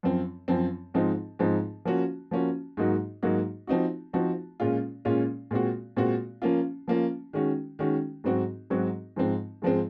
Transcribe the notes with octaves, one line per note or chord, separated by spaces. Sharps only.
F#2 F3 C4
F#2 F3 C4
G#2 F3 C4 D#4
G#2 F3 C4 D#4
F3 A#3 C#4 F#4
F3 A#3 C#4 F#4
G#2 F#3 A#3 D#4 F#4
G#2 F#3 A#3 D#4 F#4
F3 C4 D#4 F#4
F3 C4 D#4 F#4
A#2 G#3 C#4 F4
A#2 G#3 C#4 F4
A#2 G#3 C4 F#4
A#2 G#3 C4 F#4
F3 A#3 C#4 F4
F3 A#3 C#4 F4
D#3 G#3 C#4 F#4
D#3 G#3 C#4 F#4
G#2 F#3 C4 F#4
G#2 F#3 C4 F#4
G#2 F3 G#3 C4
G#2 F3 G#3 C4